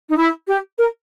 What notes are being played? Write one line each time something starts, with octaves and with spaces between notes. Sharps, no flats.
D#4
E4
G4
A#4